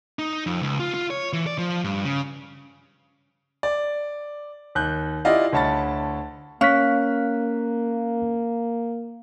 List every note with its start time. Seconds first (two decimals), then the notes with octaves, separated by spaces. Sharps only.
0.19 D#4
0.46 F2
0.63 C#2
0.80 F4
0.94 F4
1.10 C#5
1.33 E3
1.47 D5
1.58 F3
1.84 G2
2.05 C#3
3.63 D5
4.75 D#2 F#6 G6
5.25 E4 F4 G4 D5 D#5 F5
5.53 D2 C#5 A5 B5 A6
6.61 A#3 C#4 F5 F#6 B6